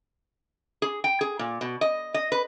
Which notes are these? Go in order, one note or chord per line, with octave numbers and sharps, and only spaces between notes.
G#4
G5
G#4
A#2
B2
D#5
D#5
B4